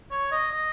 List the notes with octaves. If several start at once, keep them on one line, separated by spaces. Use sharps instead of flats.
C#5
D#5
D#5